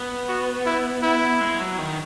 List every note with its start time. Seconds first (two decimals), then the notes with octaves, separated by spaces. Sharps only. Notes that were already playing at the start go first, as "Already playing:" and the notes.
Already playing: B3
0.29 F#4
0.66 E4
1.03 E4
1.41 G#3
1.60 F#3
1.78 D#3